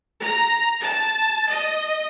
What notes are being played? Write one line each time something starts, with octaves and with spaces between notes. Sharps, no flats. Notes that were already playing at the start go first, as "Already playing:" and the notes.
A#5
A5
D#5